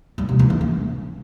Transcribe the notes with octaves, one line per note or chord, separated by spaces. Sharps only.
G3
C3
E3
A3
C#4